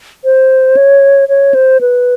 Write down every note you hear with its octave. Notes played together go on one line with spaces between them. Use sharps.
C5
C#5
C#5
C5
B4